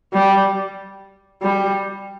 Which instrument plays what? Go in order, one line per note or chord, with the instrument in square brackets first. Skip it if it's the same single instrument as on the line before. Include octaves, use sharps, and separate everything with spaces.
[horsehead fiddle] G3
G3